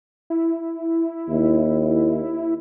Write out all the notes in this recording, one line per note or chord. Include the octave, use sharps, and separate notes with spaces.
E4
D#2